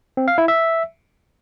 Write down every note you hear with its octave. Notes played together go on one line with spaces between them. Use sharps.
C4
F5
E4
E5